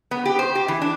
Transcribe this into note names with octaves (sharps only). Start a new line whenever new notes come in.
B3
G4
C5
G4
E3
D4